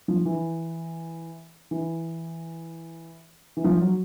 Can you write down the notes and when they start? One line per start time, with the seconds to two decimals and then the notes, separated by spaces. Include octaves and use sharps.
0.08 F3
0.25 E3
1.71 E3
3.57 E3
3.64 F3
3.81 F#3